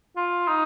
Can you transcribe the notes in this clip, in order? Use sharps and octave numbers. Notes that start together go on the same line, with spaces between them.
F4
D#4